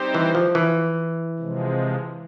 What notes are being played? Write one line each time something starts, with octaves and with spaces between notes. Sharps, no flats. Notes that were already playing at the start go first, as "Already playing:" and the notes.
Already playing: G3 C4 D#4 G4 C5
E3
F3
E3
C3 F3 G#3